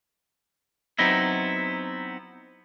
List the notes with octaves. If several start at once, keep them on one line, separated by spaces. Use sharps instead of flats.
F#3 B3 C4 D#4 E4